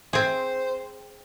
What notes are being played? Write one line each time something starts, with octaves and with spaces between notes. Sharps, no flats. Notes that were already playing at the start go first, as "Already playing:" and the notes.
C4 G#4 C5